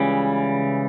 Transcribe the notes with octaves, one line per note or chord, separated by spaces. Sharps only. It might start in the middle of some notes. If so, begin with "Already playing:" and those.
Already playing: C#2 C#3 E3 G3